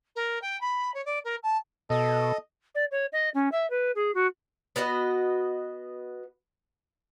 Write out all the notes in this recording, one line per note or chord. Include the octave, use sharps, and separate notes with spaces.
A#4
G5
B5
C#5
D5
A#4
A5
B2 A4 D#5
D5
C#5
D#5
C#4
E5
B4
G#4
F#4
B3 F#4 B4 D#5